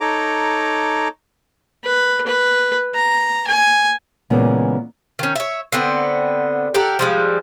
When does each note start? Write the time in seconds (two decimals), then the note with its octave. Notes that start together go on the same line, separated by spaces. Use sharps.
0.01 D#4 A4 C#5 A#5 D6
1.84 B4
2.27 B4
2.95 A#5
3.47 G#5
4.30 A#2 C#3 E3 G#3 A#3 B3
5.19 D#3 C#4
5.36 C#5 E5
5.72 D3 B3 C4
6.74 G4 A4 A#4 F#5
6.99 F3 G3 G#3